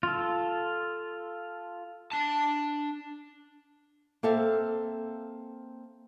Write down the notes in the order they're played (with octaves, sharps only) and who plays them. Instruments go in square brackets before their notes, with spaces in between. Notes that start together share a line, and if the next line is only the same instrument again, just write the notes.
[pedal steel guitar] F4 A4
[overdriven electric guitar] D4 A5
[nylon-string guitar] A#3 C4 A4 E5 F5